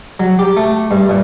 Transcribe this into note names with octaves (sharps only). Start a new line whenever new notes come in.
F#3
G4
A3
G2
A#2